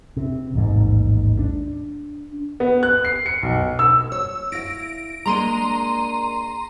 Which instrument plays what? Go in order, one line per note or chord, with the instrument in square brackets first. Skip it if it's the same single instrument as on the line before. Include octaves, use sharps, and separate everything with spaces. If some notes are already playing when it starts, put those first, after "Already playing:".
[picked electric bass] C3
A1 D#2 G#2
D4
[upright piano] B3
F#6
C7
C#7
B1
E6
[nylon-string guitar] C#5 [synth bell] E6
[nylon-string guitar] E4 F5 [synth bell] A#6 D7
[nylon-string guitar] G#3 A#3 D4 [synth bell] A#5 C6 D#7